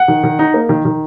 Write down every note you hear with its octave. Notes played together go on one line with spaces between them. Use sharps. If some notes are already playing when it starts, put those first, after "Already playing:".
Already playing: F#5
D#3
D#3
D#4
A#3
D#3
D#3